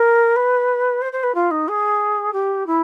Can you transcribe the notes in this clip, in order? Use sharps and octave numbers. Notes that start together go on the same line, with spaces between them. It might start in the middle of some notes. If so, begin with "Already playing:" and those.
Already playing: A#4
B4
C5
C5
B4
F4
D#4
G#4
G4
E4